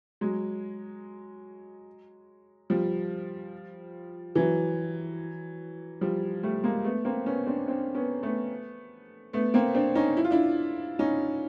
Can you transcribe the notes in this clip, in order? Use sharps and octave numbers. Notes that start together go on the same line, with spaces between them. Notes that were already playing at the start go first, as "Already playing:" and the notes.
F#3 G#3
F3 G3
E3 F#3
F3 G3
G3 A3
G#3 A#3
A3 B3
A#3 C4
B3 C#4
C4 D4
C4 D4
B3 C#4
A3 B3
A3 B3
A#3 C4
C4 D4
C#4 D#4
E4
F4
D4 E4
C#4 D#4